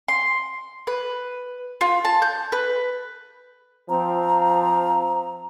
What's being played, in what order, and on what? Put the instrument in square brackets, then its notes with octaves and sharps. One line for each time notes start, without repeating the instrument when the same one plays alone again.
[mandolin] C6
B4
F4
A5
G6
B4
[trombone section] F3 C4 [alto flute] A#5